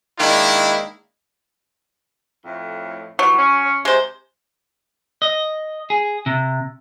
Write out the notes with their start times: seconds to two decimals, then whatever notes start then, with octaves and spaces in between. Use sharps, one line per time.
0.20 D#3 G#3 A#3 D4 E4
2.46 F2 A2
3.19 E3 F#3 G3 B3
3.38 C#4
3.85 C3 G#3 C5
5.22 D#5
5.90 G#4
6.26 C3